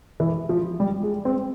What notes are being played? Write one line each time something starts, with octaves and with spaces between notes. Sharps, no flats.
E3
F3
G3
G#3
C4